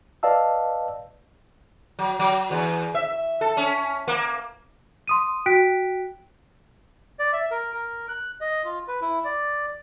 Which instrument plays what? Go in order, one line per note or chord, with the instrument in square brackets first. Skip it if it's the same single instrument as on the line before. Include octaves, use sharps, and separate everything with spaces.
[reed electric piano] B4 D5 D#5 F5 A5 E6
[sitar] F#3
F#3
E2
E5
A4
C#4
A#3
[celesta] C6 D#6 D#7
F#4 G5 F#6 B6 D7
[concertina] D5
E5
A#4
A#4
F#6
D#5
F4
B4
E4
D5